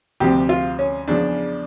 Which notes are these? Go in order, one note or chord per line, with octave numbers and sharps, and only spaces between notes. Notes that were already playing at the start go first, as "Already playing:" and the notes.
D2 C3 F3 G4
F4
C#4
E2 C#3 F3 D4